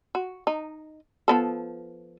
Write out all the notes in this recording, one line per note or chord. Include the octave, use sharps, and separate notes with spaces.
F#4
D#4
F3 B3 A4